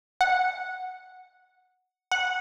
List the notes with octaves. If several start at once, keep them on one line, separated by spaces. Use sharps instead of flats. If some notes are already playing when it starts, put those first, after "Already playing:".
F#5
F#5